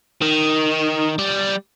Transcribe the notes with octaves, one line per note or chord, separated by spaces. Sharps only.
D#3
G3